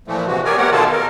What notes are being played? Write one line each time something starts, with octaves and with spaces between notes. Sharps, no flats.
A#2 E3 F3 A3
C3 E3 G#3 F#4
G4 G#4 A#4 C#5 D5 G#5
A3 B3 G4 A#4 C#5 F#5
B2 D#3 F4 G#4 A4 A5
A#4